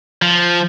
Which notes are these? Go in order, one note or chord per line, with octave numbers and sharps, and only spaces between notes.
F3